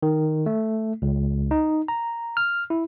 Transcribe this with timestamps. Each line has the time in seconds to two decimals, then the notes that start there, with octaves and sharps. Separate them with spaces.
0.03 D#3
0.46 A3
1.02 C#2
1.51 D#4
1.88 A#5
2.37 F6
2.70 E4